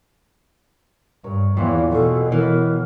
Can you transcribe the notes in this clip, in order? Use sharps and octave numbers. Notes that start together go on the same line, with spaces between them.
G2 A#4 C#5
E2 A#2 E3 C4 F4 G4
B2 F#3 G#4 A4 C#5
E3 A#4